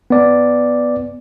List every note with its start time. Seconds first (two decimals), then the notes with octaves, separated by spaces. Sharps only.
0.10 B3 D5